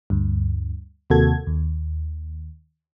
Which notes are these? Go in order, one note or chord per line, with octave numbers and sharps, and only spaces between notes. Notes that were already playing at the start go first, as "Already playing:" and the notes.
D2 G2
D#2 C3 A#3 F#4 A4 G#6
D#2